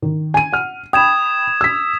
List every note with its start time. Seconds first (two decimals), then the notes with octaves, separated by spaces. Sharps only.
0.02 D#3
0.34 G#5 D#7
0.53 F#5 F6
0.93 G5 B5 D#6 G#6 E7
1.61 E6 B6